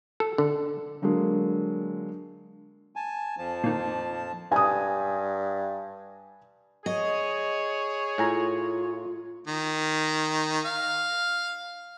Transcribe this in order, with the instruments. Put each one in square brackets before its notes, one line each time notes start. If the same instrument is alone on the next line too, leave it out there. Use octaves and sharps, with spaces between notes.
[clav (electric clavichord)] A4
D3
[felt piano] D3 F#3 G#3 A#3 D4
[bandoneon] G#5 A5
F2 F3 A5
[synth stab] A#2 D#3
[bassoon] G2 [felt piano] G#5 D#6
[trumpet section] G#4 C#5 [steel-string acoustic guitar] D#5
[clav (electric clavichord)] A2 G#5 A#5 [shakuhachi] F4
[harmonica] D#3
F5